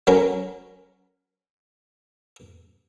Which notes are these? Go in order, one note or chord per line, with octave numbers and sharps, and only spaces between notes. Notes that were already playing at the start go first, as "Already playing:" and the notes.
F#3 C#4 A#4